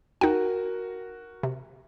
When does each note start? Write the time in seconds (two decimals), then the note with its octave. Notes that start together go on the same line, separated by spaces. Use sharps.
0.21 D#4 F#4 A#4 G5
1.43 C3